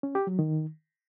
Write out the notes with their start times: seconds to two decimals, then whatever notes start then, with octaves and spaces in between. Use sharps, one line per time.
0.03 C#4
0.15 G4
0.27 F#3
0.39 D#3